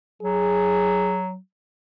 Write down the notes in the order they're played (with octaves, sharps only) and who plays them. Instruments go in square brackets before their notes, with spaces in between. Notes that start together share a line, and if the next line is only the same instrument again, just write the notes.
[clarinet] F#3 [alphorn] G#4